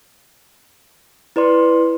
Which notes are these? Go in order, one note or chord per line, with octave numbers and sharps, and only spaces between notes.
E4 B4 D5 C6